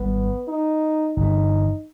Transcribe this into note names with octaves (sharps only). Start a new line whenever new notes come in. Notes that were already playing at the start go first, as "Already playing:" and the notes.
Already playing: G#1 G#2 G3 B3
D#4
G1 G2 E3 D#4